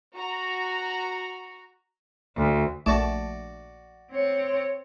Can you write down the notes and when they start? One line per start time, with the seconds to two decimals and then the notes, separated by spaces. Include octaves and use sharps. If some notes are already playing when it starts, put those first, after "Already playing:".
0.15 F#4 A#5
2.37 D2
2.86 A#1 A3 F#4 D5 A5 D6
4.12 C4 C#5